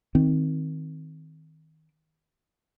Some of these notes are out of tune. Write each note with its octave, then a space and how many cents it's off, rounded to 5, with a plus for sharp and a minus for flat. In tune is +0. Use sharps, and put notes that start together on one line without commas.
D#3 +15 C4 +0